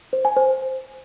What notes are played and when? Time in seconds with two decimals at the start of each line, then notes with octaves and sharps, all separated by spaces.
0.13 C5
0.25 G#5
0.37 C5